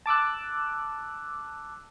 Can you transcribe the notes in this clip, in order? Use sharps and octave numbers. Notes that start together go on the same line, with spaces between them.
A5 D6 E6 F#6